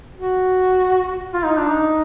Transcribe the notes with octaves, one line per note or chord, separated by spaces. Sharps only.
F#4
F4
D#4
D4
D#4